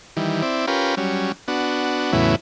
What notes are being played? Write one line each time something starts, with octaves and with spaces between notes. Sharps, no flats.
D#3 E3 G3
C4 E4 D5
C#4 F4 G4 A#4 B4
F#3 G3 C#4
B3 D4 F#4
E2 A2 C#3 F#3 B3 E4